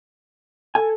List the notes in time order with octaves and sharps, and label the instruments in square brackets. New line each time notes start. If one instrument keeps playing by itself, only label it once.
[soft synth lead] A4 [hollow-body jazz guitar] G#5